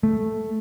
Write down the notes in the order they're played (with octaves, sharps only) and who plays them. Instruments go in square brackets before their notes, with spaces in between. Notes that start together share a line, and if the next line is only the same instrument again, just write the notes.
[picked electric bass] A3